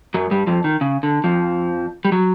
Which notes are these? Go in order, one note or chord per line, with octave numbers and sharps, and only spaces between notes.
F#2 F#3
G2 G3
F2 F3
D#3
C#3
D3
F2 F3
G3
F#3